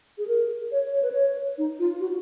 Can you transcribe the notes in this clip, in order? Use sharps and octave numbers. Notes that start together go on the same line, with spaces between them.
G#4
A#4
C#5
C#5
B4
C#5
D#4
F4
F#4